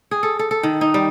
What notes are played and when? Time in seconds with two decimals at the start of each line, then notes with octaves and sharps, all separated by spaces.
0.11 G#4
0.23 A4
0.39 A4
0.51 A4
0.63 D#3
0.81 D#4
0.94 G3